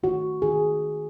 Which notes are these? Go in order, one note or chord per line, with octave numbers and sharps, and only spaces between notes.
D#3 A3 F#4
D#3 G#4